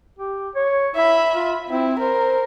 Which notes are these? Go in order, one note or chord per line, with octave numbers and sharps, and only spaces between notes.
G4
C#5
E4 E5 B5
F4
C4 E4
A#4 C5